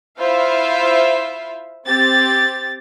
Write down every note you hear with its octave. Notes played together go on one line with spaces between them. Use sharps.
E4 F4 C5 E5 F5
C4 G4 A6